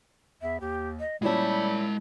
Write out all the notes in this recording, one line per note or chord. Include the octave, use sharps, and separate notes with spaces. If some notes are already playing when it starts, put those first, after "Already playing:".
E2 E5
D#2 G4
D#5
A#2 G3 G#3 C#4 E4 A5